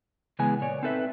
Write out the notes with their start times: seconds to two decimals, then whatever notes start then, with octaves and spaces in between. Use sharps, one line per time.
0.39 C#3 E3 G#3 B3 G#5
0.61 A#2 C#5 D5
0.83 C4 D#4 A4 B4 E5